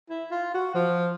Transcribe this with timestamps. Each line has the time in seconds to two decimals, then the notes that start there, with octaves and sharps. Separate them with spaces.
0.10 E4
0.31 F4
0.54 F#4
0.75 F3